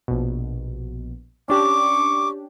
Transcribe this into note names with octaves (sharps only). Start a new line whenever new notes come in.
A#1 B2
C#4 D4 G4 C#6 D6